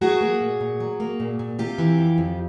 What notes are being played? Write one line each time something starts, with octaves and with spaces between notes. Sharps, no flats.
F#3 F#4 G#4
A#3
A#2
A#2
F#3
A#3
A#2
A#2
C3 F4 G4
E3
F2
F2